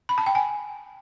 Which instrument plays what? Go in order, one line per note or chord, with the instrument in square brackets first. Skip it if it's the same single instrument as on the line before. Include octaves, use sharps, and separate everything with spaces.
[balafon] B5
A5
G5
G#5